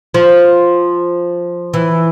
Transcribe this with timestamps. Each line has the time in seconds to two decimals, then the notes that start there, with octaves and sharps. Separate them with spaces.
0.14 F3
1.74 E3